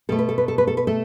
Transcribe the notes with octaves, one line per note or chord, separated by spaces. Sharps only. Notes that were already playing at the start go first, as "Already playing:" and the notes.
B2 A3 A4
B4
A4
B4
A4
B4
A4
B4
A3 A4